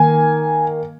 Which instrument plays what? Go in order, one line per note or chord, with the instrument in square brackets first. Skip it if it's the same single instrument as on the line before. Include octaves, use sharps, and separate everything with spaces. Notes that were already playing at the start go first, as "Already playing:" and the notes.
Already playing: [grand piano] D#3 A#3 G#5